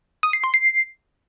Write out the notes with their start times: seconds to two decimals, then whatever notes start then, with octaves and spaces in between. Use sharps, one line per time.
0.23 D#6
0.33 C7
0.44 C6
0.54 C7